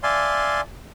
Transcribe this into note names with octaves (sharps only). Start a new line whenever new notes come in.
D5 E5 F5 G#5 A5 C6